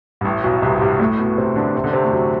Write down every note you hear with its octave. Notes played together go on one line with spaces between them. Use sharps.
G2
A1 A2
B1 B2
C2 C3
F#3
G2 G3
A2 A3
B2 B3
C3 C4
D3 D4
C3 C4
D3 D4
C3 C4
A2 A3
F#2 F#3